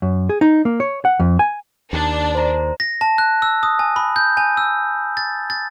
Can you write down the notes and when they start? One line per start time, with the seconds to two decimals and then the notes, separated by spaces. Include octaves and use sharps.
0.02 F#2
0.29 G#4
0.41 D#4
0.65 A#3
0.80 C#5
1.05 F#5
1.20 F2
1.39 G#5
1.93 D#2 D4
2.35 C5 A#5
2.80 A#6
3.01 A5
3.18 F#6
3.42 E6
3.63 D#6
3.79 G#5
3.96 B5
4.16 G6
4.37 G#5
4.57 E6
5.17 A6
5.50 A6